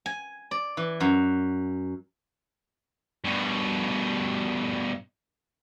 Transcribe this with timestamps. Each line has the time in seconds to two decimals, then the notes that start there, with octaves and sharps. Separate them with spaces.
0.06 G#5
0.51 D5
0.77 E3
1.00 F#2
3.24 G2 B2